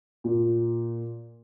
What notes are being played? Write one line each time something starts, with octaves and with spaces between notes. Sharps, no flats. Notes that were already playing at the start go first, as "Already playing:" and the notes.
A#2